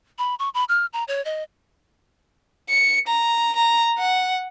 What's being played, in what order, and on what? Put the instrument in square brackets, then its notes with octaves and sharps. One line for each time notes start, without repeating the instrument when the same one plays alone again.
[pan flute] B5
C#6
B5
F6
A#5
C#5
D#5
[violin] C#7
A#5
A#5
F#5